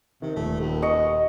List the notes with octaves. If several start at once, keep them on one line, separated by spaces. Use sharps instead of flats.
C3 D#3
D#1 A3
D#2
D#5 C#6 C#7